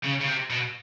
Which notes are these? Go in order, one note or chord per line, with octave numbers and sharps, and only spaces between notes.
C#3
C#3
C3
B2